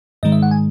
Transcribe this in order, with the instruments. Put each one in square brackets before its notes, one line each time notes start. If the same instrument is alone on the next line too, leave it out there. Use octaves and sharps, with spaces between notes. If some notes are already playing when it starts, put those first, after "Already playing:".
[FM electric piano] G#2 D#3 G#3 D#5
E5
F#5
G#5